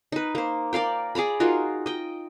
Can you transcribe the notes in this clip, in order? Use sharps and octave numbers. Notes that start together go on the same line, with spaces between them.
D#4 B4
A#3 C5
A#4 D5 F5 G5
G#4 D5 A#5 B5
D#4 F4 F#4 A#4
D#5 G5